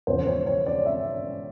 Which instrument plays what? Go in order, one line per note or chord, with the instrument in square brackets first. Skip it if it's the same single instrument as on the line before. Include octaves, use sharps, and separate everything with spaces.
[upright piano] E1 E2 C#3 F3 C5
C#5
C#5
D5
E5